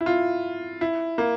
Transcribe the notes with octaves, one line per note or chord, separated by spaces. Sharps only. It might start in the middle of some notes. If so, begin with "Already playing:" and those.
E4
F4
E4
A#3